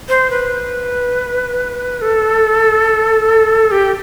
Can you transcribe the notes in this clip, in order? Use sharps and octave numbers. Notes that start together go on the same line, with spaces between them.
C5
B4
A4
G4